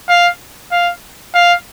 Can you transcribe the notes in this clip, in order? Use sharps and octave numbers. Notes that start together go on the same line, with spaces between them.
F5
F5
F5